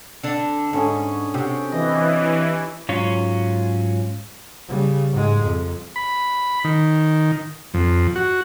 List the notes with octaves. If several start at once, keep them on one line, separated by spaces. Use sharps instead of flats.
D3 D4
G#2 D3 C#4 G#4
C3 F#4 G4
E3 D#5
G#2 F#3 C#4 F4
C#3 G3
G#2 G#3
F2
B5
D#3
F2
F#4